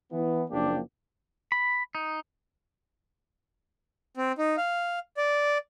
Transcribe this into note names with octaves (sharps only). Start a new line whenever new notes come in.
E3 B3
F#1 F3 A#3 D4 G4
B5
D#4
C4
D#4
F5
D5